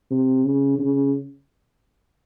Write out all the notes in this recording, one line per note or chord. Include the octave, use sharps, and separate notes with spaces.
C3
C#3
C#3